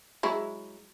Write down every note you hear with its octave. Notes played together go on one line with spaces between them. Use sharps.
F#3 G#3 E4